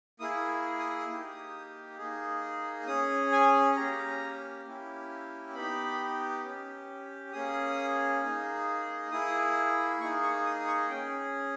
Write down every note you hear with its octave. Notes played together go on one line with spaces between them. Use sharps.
A#3 E4 G#4 D#6
D#6
A#3 D#4 G4 D#6
A#3 D#4 G#4
C#4 G#4 D#6
G#5
A#3 C#4 G4 A#5
A#3 C#4 E4 G4
B3 D#4 G4 B5
C#4 G4
A#3 C#4 G#4 D#6
A#3 D#4 G#4
A#3 E4 G#4 D#6
A#3 D#4 G#4 C#6
C#6
D#6
C#6
C#4 G#4 G5